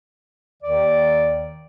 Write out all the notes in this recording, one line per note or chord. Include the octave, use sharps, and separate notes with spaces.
D#2 D#3 D5